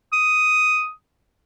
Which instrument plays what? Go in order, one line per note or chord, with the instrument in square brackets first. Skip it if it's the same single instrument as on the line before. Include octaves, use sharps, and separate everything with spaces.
[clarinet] D#6